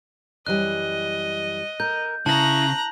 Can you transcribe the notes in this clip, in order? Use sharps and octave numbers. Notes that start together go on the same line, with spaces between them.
F#2 E3 G3 D#5 F#6
A#4 G6
C#3 E4 A5 A#5 F#6 A#6